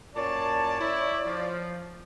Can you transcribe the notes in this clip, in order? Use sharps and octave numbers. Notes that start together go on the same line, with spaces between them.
F#2 A#2 C#5 D5 A5
E4
F3